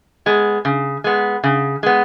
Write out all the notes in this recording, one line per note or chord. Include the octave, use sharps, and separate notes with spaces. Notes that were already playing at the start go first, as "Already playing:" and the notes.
G#3 B3
C#3
G#3 B3
C#3
G#3 B3